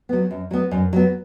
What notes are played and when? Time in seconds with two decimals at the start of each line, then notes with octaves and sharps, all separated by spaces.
0.09 F#3 B3
0.31 F#2
0.51 F#3 B3
0.71 F#2
0.93 F#3 B3